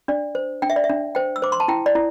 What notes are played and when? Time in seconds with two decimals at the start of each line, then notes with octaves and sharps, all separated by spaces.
0.08 D4 D5
0.35 C5
0.62 D4 G5
0.70 E5
0.76 D5
0.84 E5
0.89 D4
1.15 C5 G5
1.36 E6
1.42 C5 D6
1.52 C6
1.60 A5
1.68 E4 G5
1.86 D5
1.95 E4